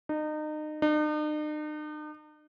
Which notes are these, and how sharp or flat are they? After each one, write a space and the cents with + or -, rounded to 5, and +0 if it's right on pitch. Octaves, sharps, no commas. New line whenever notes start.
D#4 -30
D#4 -45